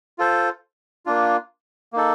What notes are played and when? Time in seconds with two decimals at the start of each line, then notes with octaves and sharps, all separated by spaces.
0.19 F4 A4 C5
1.06 A#3 D4 F4
1.93 A#3 D#4 A4